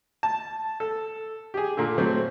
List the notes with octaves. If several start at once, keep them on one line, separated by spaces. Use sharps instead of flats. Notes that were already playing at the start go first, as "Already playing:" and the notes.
A5
A4
G4 G#4
A#2 D3
F#3 A3 C4